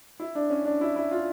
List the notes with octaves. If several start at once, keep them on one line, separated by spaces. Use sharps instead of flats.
E4
D4
C#4
D4
E4
E4
F4